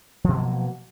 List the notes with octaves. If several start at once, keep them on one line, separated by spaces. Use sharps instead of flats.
B2 F3 F#3 A#3